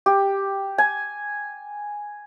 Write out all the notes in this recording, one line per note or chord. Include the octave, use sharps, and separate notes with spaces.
G4
G#5